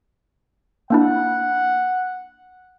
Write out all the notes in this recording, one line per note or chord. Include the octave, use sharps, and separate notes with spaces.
A#3 D4 E4 F#5